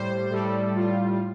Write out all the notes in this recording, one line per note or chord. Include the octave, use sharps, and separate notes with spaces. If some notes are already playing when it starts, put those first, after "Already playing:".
Already playing: A2 G3 C5
A2 G3 A4
F4